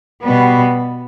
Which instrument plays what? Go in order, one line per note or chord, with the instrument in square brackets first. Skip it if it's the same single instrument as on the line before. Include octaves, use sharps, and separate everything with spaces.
[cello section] B2 G3 B3